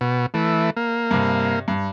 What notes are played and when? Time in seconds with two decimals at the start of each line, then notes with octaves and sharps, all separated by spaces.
0.01 B2
0.34 E3 A3
0.77 A#3
1.11 G2 C3
1.68 G2